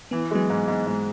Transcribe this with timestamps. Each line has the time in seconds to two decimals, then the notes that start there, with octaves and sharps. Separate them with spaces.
0.11 E3 B3
0.31 F#3 G#3 B3
0.50 G#2
0.68 G#2
0.87 G#2